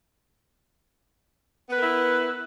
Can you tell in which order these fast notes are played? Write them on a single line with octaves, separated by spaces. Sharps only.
B3 B4 A#4 E4